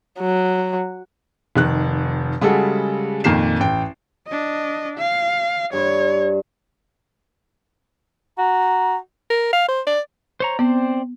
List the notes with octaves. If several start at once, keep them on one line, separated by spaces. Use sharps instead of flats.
F#3
F1 D#3 F#6
C#3 G3 G#3 F#4 A4
F2 A#2 D#3 A#3 C7 E7
A1 G5
D4 D#5
F5
G2 C5 C#5
F#4 A#5
A#4
F5
C5
D5
C5 C#5 A#5
B3 C4 C5 D5